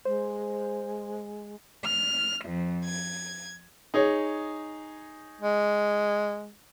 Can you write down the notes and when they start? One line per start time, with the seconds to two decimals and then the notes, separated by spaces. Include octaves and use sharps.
0.05 G#3 C5
1.84 F6
2.45 F2
2.86 G#6
3.94 D#4 G#4 C#5
5.41 G#3